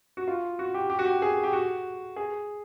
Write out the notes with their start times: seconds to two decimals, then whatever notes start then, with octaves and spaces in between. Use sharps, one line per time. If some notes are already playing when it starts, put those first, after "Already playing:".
0.17 F#4
0.28 F4
0.59 F#4
0.74 G4
0.90 G4
0.99 F#4
1.06 G4
1.22 G#4
1.43 G4
1.53 F#4
2.16 G#4